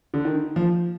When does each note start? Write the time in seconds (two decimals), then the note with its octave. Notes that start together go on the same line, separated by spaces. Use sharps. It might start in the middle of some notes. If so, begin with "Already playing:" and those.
0.14 D3
0.25 D#3
0.56 F3